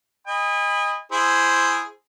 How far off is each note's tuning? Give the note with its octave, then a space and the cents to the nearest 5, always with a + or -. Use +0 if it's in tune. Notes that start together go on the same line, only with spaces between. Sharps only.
D#5 +0 G#5 -40 B5 +0
E4 +15 G#4 +0 C5 +0